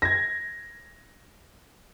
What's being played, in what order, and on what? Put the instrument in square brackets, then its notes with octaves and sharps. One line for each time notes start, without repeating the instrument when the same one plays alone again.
[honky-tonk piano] G#6 A#6